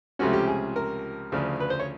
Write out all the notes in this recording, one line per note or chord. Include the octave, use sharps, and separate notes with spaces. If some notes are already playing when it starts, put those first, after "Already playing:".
C#2 C3 F3 A3 C#4 F#4
G4
G#4
A#4
D2 C#3 F3
B4
C5
C#5